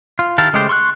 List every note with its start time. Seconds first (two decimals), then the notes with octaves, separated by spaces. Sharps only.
0.19 F4
0.38 D#3 E4 G4 F5 A5
0.53 C#3 G#3 A3 G4 C5
0.69 C6 C#6 E6 F#6